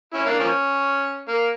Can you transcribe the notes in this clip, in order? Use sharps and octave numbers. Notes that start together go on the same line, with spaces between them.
C#4 E4
A#3 D4
F3 A#3 C#4
A#3